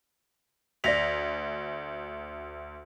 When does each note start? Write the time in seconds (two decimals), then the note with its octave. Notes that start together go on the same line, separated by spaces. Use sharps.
0.84 D2 D5 A#6 B6 F7